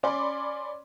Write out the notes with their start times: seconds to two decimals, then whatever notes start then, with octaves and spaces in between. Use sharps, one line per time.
0.03 C#4 D5 B5 C6 D6